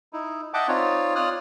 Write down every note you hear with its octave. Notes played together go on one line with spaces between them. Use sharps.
D#4 E4
D#5 E5 F#5 G5 A5 D6
C4 D#4 F4 C#5 D5
F4 C#5 D5 D#6 F6 F#6